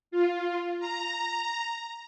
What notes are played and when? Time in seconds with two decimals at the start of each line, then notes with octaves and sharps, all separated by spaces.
0.11 F4
0.80 A#5